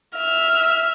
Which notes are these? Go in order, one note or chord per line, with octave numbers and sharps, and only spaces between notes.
E5 F6